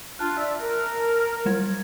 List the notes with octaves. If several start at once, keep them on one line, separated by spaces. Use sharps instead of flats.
D4 F4 A5 F#6
D5 E5
A#4
F#3 G3 G#6